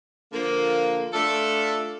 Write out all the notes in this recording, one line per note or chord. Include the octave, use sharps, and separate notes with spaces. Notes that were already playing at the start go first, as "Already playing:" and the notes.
D3 F3 A#3
A3 D4 F4 A4